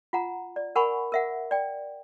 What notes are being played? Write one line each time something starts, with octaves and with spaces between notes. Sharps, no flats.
F4 F#5 A#5
D5
A#4 F#5 G#5 B5 C#6
A#4 E5 F#5
D5 G5